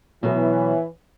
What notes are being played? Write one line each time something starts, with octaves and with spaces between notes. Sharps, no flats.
B2 E3 F#3 B3